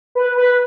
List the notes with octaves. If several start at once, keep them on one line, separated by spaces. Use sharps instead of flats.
B4
B4